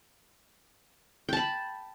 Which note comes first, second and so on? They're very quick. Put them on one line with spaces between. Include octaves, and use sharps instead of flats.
G5 A5 B5